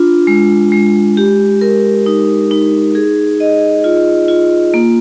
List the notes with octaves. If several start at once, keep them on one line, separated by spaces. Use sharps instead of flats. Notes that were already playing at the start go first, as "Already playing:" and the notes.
Already playing: D4 F4
G#3
G#3
G4
A#4
D#4
D#4
G#4
D#5
F4
F4
A#3